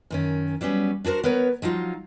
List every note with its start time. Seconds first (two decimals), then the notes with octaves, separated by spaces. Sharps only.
0.10 F#2 D#3 C#4
0.61 F#3 G3 B3 C#4
1.04 D4 F#4 G#4 A#4 C5
1.24 B3 A#4 B4 C#5
1.62 F3 F#3 D#4 F4